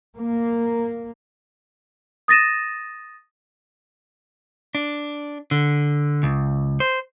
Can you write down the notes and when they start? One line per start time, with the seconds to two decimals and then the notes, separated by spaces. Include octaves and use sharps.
0.18 A#3
2.28 D#6 A6 A#6 D#7 E7
4.75 D4
5.51 D3
6.23 C#2
6.80 C5